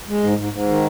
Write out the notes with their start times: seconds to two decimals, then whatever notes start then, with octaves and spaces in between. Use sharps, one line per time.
0.08 G#3
0.23 G#2
0.37 G#2
0.52 G#2
0.68 D#3